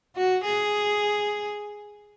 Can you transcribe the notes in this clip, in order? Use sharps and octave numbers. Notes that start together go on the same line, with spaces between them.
F#4
G#4